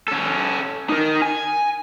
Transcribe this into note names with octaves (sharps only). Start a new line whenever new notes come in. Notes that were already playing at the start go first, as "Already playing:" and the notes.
C#4 A4
D#4 A#4
G#5